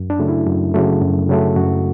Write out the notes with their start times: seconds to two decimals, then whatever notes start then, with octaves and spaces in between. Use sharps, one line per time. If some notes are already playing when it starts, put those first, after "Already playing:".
Already playing: F#2
0.10 D4
0.20 C#3 F#3 A3
0.28 E4
0.47 F#2
0.74 C#3 F#3 A3
1.02 F#2
1.29 C#3 F#3 A3
1.56 F#2 F#4